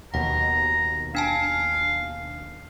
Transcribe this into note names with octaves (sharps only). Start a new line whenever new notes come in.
D#2 B2 F#5 A#5
D4 F5 G#5 A5